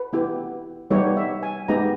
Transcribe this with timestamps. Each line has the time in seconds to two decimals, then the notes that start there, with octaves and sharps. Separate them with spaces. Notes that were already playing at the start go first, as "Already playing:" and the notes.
Already playing: B4
0.13 B3 E4 G4
0.91 G3 B3 D#4 G4 C#5
1.17 E5
1.43 G#5
1.68 G#3 B3 D#4 G4 A#5